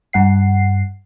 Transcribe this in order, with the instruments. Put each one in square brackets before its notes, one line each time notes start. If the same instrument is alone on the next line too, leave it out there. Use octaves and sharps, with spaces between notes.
[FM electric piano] G2 F#5 C7